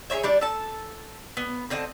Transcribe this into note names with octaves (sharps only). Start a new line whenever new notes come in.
G#4 B4 C#5 E5
G3 D4 D5
A4 A5
B3
D3 C4 D#5 A5